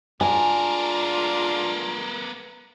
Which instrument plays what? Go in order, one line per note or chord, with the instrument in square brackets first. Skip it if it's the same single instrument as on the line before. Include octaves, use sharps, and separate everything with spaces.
[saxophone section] G#3 D4 F4 [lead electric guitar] B3 A#4 [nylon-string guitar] G#5